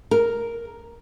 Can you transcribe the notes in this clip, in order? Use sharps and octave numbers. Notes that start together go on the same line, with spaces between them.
A#4